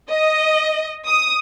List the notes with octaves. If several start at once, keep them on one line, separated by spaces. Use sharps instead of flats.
D#5
D#6